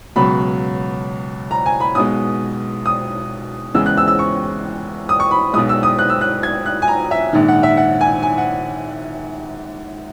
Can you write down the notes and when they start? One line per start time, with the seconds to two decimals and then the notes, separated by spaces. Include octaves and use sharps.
0.16 C#2 B2 F#3 B5
1.51 A#5
1.66 G#5
1.80 B5
1.95 B1 B2 G#3 D#6
2.86 D#6
3.74 E2 C#3 E3 G#3 E6
3.86 F#6
3.98 E6
4.08 E6
4.19 C#6
5.09 D#6
5.20 C#6
5.31 B5
5.53 G#3 D#6
5.57 B1 B2
5.69 E6
5.83 D#6
5.99 F#6
6.10 E6
6.21 F#6
6.43 G#6
6.66 F#6
6.82 G#5
6.88 A#5
7.11 E5
7.33 A#1 G#2 D#3
7.48 F#5
7.63 E5
7.77 F#5
8.01 G#5
8.23 G#5
8.38 F#5